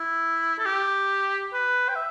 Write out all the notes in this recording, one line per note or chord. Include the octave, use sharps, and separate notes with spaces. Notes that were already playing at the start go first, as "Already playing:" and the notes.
Already playing: E4
A4
G4
B4
G5
E5